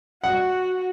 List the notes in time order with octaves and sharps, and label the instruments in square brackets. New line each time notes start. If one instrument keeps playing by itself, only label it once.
[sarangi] F#4 [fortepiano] F#5